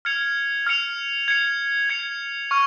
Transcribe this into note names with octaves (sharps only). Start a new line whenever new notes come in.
F6 G#6 C#7 F7
F6 G#6 C#7 F7
G#6 C#7 F7
G#6 C#7 F7
C#6 F6